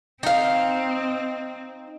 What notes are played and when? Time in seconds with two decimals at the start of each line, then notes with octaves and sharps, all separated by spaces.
0.23 C4 D#4 F5